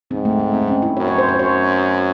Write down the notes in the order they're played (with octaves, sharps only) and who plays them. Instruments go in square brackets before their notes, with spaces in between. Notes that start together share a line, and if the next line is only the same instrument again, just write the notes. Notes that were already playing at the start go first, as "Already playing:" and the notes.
[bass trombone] G#2 [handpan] C4
[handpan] A3
A3
C4
D#4
C#4
E4
[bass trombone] F#2 [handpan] C#5
[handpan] C#5
C5
C5
[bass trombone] F#2 [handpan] C#5